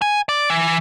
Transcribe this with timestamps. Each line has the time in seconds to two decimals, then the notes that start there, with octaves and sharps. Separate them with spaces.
0.02 G#5
0.29 D5
0.50 E3